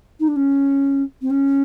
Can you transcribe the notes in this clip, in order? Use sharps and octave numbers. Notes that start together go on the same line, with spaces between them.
D#4
D4
C#4
C4
C#4